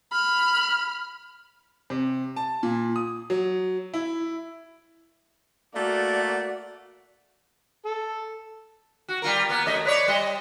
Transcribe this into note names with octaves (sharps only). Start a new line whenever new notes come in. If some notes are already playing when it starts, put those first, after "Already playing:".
B5 F6
C3
A5
A#2
D#6
F#3
E4
A3 A#3 F#4 D5
A4
F#4
G3 F4 A#4
A#3 B3
F#2 A3 D#5
B4 C#5 D5
G3 D#5